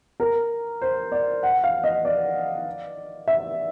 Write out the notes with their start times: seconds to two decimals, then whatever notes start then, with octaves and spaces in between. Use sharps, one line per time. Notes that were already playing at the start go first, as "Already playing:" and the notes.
0.20 A#4
0.82 C5
1.12 D5
1.43 F#5
1.64 F5
1.84 D#5
2.05 D5
3.28 E5